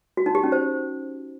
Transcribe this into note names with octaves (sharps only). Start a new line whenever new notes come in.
F#4
D#4
G4
C#4
C5